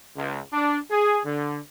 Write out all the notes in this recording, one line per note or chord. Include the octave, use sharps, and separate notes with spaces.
C#2
D4
G#4
D3